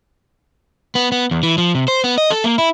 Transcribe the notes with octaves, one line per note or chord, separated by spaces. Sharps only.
B3
B3
E2
E3
F3
C3
C5
B3
D#5
A4
A#3
E4